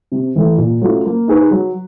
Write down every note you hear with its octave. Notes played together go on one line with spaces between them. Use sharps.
C3
E3 A3
A#2
F#3 A3 C#4 F4
A#3
D#4 G#4 B4
F#3